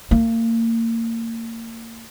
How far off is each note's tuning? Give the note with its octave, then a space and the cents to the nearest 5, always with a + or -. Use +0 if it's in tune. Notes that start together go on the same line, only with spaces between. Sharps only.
A#3 -30